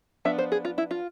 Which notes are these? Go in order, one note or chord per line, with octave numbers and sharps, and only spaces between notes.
F3 B3 D4 E5
C5
G#4
F4
E4
F4